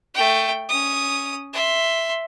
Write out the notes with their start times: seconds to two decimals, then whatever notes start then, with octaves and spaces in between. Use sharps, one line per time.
0.14 A3 G5
0.69 C#4 D#6
1.53 E5 C6